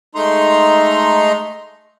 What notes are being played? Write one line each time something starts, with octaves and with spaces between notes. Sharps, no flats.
G#3 A3 D#4 A#5 C6